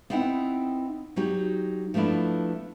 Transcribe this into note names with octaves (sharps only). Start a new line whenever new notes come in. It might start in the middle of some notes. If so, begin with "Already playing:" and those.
B3 C4 D#4 E4 F#5
F#3 D#4 F#4 G4
F3 A3 B3 D4 E4